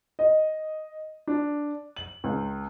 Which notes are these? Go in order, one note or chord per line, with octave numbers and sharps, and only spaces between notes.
D#5
D4
F#7
C#2